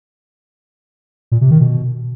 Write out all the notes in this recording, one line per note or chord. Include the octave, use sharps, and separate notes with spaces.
A#2
C3
D#3
B2